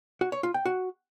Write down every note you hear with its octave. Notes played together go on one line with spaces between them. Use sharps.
F#4
C#5
F4
G5
F#4